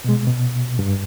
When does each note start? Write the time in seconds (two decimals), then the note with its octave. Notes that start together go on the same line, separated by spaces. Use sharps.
0.04 B2 G#3
0.27 B2
0.79 G2